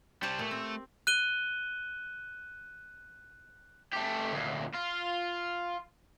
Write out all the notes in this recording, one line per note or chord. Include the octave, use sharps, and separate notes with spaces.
G3 G4 C5 C#5 A5
A#2 A3
C4
F#6 D#7 G7
A3 G4
D2 A#2
F4